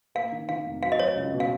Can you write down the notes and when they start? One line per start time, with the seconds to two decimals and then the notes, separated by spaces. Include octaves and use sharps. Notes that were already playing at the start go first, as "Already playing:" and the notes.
0.15 A#3 F5
0.32 D#3
0.49 D#3 F5
0.66 F1
0.83 F#3 F5
0.92 D#5
0.99 F#3 C#5
1.08 D#5
1.17 C#2
1.34 B2
1.40 F5